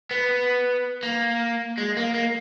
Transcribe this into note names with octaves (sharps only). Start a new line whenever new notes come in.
B3
A#3
G#3
A#3
A#3